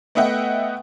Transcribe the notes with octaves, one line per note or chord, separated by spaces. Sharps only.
A3 B3 D#5 E5 F#5 G5